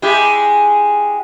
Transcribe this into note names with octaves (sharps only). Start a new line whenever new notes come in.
G#3 E4 G4